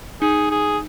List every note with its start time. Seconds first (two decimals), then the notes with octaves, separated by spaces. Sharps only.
0.22 D#4 G#4
0.51 G#4